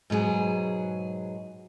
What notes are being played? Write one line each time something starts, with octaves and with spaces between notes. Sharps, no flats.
G#2 B2 F#3 G#4